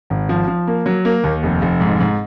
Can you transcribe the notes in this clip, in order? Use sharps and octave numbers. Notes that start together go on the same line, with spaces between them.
G#1
F3
F3
A#3
F#3
A#3
D#2
F1
F1
G#2
G#2